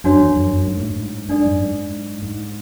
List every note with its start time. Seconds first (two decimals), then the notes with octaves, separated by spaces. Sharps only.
0.04 F#2 D4 F#4 C#5
0.19 E2
0.35 F#2
0.51 F#2
0.66 G#2
0.80 A2
0.94 G#2
1.29 G#2 D4 A4 D5
1.45 F#2
1.60 G#2
2.22 G#2